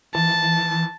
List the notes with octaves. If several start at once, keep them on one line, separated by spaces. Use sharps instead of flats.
E3 A5